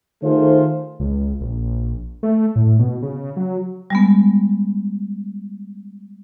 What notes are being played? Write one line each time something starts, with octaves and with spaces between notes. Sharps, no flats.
D#3 A3 F4 G#4 A4 C5
C#2
A#1
A3
A2
B2
C#3
F#3
G3 G#3 B3